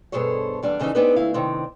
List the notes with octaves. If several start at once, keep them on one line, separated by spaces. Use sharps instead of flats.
G2 B2 G#4 A4 C5 C#5
E2 G3 D4
F2 C#3 E3 D4 D#4
B3 C4 D4 D#4 G#4 B4
D2 E4 F5
C3 D#3 C4 D4